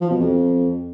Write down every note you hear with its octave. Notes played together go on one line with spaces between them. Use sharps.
F3
B2
F2